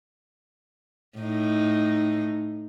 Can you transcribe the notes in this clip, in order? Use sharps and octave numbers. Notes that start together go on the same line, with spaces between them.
A2 D#4